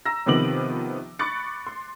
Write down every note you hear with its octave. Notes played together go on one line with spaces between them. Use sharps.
A#5 E6 A#6
C3 D#3 F3 B3 D6 F#7
B5 C#6 D6 F#6 A6 C#7
C6